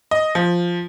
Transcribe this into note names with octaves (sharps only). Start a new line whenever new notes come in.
D#5
F3